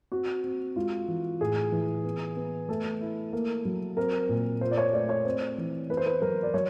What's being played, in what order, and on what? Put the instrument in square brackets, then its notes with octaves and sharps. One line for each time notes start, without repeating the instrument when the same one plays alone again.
[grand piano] C4 [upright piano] F#4
[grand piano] C4
[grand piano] G#3 [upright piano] F4
[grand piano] E3
[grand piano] A2 [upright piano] G#4
[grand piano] E3
B3
B3
[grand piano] A3 [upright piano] A4
[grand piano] E4
A#3
F#3
[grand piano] C4 [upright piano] A#4
[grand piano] A#2
[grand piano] F4 [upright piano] C5
[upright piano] D5
C#5
[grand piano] A3 [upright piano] D5
[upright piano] C#5
[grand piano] C4 [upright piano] C5
[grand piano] E3
[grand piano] B3 [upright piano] B4
[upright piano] C5
B4
[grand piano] F#3 [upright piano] A#4
[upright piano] D5
[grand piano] F#3 [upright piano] C#5